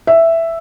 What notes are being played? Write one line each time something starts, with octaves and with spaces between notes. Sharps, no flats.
E5